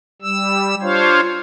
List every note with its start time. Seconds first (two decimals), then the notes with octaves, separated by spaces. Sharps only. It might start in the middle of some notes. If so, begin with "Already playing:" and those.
0.22 G3 E6
0.82 D4 F4 C5 C#5 F5